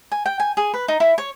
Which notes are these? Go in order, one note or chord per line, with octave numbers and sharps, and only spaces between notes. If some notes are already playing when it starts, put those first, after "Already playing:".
G#5
G5
G#5
G#4
B4
D#4
E4
C#5